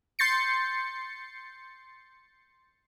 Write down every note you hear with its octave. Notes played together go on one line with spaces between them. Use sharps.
C6 G6 A6 C7 C#7